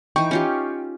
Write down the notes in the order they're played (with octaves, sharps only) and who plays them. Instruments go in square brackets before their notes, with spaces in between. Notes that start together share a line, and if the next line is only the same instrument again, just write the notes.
[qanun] E3 D#4 [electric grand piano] G5 C#6
[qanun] C#4 F4 G4